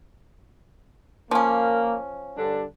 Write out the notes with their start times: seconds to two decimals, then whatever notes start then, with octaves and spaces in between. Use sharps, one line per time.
1.31 F3 A#3 C#4
2.37 G2 D3 D4